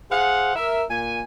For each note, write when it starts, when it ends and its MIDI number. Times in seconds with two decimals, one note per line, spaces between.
0.11 0.52 68
0.11 0.52 72
0.11 0.52 77
0.11 0.52 78
0.56 0.83 70
0.56 0.83 76
0.89 1.21 46
0.89 1.21 80